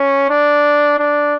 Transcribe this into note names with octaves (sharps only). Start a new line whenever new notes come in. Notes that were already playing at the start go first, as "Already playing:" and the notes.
Already playing: C#4
D4
D4